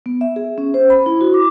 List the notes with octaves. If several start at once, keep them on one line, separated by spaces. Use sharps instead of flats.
B3
E5
G#4
C#4
C5
B5
E4
F#4
D6